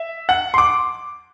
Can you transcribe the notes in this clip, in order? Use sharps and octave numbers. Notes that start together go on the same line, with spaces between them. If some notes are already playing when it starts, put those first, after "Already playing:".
Already playing: E5
F#5
C6
D6